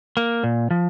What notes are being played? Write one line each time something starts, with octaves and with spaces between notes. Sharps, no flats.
A#3
A#2
F3